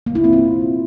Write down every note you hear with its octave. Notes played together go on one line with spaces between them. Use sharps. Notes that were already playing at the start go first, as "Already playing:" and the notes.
A#3
E4
C4
F4